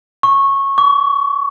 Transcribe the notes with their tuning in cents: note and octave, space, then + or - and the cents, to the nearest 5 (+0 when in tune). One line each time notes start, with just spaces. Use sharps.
C#6 -15
C#6 +40